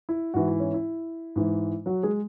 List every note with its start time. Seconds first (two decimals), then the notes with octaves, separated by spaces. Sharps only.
0.09 E4
0.34 G#2 E3 F#4
0.47 E4
0.60 C#4
0.74 E4
1.36 G#2 E3
1.86 F#3 F#4
2.03 G#3 G#4